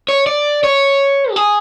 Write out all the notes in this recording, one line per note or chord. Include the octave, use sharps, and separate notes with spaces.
C#5
D5
C#5
G4
G#4